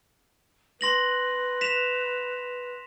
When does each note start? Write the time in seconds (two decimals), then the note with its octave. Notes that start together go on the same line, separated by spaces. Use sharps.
0.81 B4 C6 A#6 F#7
1.61 B6 E7 F7